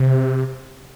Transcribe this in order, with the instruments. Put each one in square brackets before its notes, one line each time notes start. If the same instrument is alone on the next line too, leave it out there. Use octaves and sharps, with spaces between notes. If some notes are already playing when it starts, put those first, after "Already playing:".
Already playing: [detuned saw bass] C3